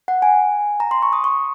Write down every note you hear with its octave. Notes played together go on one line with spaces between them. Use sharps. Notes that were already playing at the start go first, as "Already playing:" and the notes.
F#5
G#5
A#5
C6
C#6
D#6
C#6